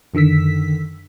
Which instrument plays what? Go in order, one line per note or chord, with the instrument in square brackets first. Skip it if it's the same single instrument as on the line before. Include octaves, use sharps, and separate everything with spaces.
[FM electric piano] F#2 D3 D#3 E6 B6